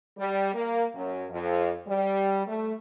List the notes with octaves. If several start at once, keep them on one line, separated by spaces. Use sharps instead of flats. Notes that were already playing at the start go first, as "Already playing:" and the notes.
G3
A#3
F#2
F2
G3
A3